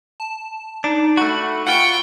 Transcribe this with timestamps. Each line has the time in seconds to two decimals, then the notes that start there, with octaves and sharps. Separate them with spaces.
0.20 A5
0.84 D4 D#4
1.17 A3 F#4 B5
1.67 F4 F#5 G5 C#6